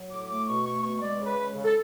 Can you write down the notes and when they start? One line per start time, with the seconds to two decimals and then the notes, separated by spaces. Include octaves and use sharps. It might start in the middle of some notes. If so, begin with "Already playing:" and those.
Already playing: F#3
0.11 A2 D6
0.29 A3 D6
0.47 B2 C#6
0.66 A3 C#6
0.83 B2 C#6
1.01 G#3 D5
1.19 C#3
1.25 B4
1.37 G#3
1.55 C#3
1.64 A4